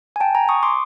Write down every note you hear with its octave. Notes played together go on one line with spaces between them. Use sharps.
G#5
G5 A5
G#5 A#5
C#6 D#6
C6 D6